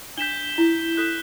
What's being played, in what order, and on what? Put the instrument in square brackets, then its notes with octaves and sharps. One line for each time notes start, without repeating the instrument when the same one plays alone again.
[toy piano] D4 [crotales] G6 B6 E7 G7
[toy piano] E4
[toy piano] A4 [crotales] F#6 B6 E7